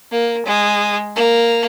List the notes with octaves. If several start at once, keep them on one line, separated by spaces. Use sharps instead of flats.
A#3
G#3
A#3